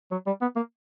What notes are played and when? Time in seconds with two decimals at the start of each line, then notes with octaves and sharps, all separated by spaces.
0.11 F#3
0.27 G3
0.41 B3
0.56 A#3